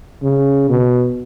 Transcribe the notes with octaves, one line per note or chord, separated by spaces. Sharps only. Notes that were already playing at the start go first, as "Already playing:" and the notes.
C#3
B2